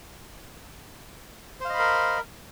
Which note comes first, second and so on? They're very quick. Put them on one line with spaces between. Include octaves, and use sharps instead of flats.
C5 F5 D#5 B5 A#4